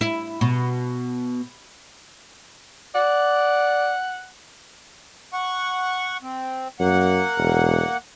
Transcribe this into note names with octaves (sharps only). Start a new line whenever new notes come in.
E4
B2
D5 F#5
F#5 C#6
C4
F#2 A#3 F#5
E1